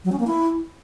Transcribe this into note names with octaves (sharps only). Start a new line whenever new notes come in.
F#3
C#4
A#3
E4